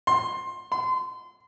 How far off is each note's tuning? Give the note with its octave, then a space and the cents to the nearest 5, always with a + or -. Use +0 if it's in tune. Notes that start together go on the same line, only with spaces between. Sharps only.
C6 +15
C6 -30